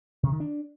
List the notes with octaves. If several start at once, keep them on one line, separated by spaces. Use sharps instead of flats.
C3
D#3
D4